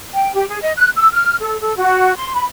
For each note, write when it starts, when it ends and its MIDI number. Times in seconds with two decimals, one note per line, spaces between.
0.14 0.32 79
0.34 0.48 67
0.49 0.59 68
0.62 0.73 75
0.77 0.89 90
0.96 1.08 88
1.13 1.36 89
1.41 1.59 69
1.61 1.74 69
1.76 2.15 66
2.16 2.34 84
2.35 2.44 83